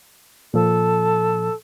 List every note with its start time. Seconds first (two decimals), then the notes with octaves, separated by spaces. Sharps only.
0.54 A#2 F3 A4